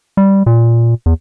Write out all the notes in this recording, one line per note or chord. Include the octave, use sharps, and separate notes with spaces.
G3
A#2
E2